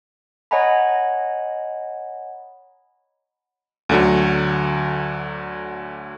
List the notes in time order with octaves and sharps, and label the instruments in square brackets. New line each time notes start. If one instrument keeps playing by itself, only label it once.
[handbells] C#5 D#5 F#5 G#5 A#5 B5
[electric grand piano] D2 D3 F#3